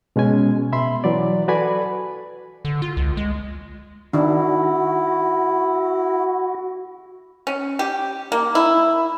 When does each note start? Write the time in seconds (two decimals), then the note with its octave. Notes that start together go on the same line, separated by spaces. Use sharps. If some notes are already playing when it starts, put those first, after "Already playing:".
0.16 B2 G#3 C#4 G#5
0.72 B2 E5 B5 C6
1.04 E3 F#3 D5
1.48 F#4 A4 B4 D5 G#5 B5
2.65 D3
2.82 F4
2.97 C#2
3.17 G#3
4.13 D#3 D4 E4 F#4
7.47 C#4
7.79 G4
8.32 A#3
8.55 E4